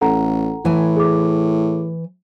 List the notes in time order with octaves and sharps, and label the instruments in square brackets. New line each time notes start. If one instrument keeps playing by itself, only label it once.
[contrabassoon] A1 [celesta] A4 F#5 A#5
[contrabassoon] A2 [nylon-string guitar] E3 G#5
[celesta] G#4 D6